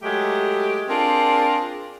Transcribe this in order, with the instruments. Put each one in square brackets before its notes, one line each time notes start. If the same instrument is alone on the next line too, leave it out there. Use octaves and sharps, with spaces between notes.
[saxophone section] F#3 G#3 A3 G4
C4 D4 F4 G#4 A#4